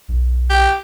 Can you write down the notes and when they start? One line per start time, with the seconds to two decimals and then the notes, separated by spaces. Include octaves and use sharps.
0.08 B1
0.50 G4